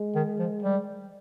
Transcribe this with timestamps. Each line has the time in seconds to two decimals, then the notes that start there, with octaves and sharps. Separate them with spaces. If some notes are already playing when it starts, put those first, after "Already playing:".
Already playing: G#3
0.16 D#3
0.39 F3
0.63 G3